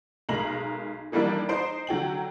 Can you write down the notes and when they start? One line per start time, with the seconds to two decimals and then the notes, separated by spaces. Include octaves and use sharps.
0.29 B1 G#3 A#4 A#5 F#7
1.12 D#3 E3 G3 A#3 D4 D#4
1.49 D#4 C5 D7
1.87 D3 F#3 G5 F#7